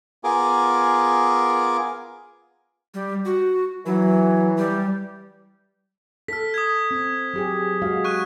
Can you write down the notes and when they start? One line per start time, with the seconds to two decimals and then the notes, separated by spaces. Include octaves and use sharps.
0.24 B3 F4 G#4 A#4 G#5 D6
2.94 G3
3.25 F#4
3.86 E3 F#3
4.57 G3
6.28 A4 F6 B6
6.54 D#6 G#6
6.91 C4
7.34 F#3 G4 G#4
7.82 G#3 F#4 F5
8.04 C#6 F#6 D#7